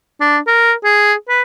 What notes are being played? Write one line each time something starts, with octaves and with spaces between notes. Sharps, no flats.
D4
A#4
G#4
B4